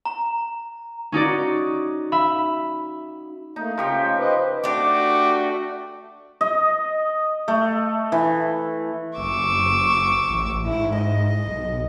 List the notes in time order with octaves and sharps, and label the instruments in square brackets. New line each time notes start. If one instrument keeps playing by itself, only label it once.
[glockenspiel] A#5
[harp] C#4 D#4 F#4 D5
E5 B5
[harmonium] A3 A#3 [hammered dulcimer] D#4
[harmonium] C#3 [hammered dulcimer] F3 G4 C#6
[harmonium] B4 C5 D#5
[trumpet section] A3 F#4 [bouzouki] D4 G4 [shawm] D6
[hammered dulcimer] D#5
A3
E3
[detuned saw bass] F#1 [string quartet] C#6 D6 E6
[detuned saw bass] A1
[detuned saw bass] G#2 [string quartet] E4
[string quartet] D#5
[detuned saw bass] B1